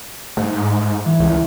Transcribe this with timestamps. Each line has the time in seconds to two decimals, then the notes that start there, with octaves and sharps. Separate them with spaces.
0.37 G#2 A3
1.05 E3
1.20 C#2